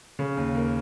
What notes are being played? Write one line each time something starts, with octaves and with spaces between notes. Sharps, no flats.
C#3
D#2
A#3